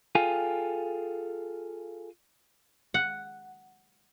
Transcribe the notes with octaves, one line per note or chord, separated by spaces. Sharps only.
F4 G#4 A4 F5 G5 G#5
F#5